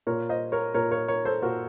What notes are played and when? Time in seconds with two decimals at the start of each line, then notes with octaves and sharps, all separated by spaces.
0.07 A#2 A#4 C#5
0.29 C5 D#5
0.52 A#4 C#5
0.74 A#2 A#4 C#5
0.91 A#4 C#5
1.08 A#4 C#5
1.25 A4 C5
1.42 A#2 F#4 A#4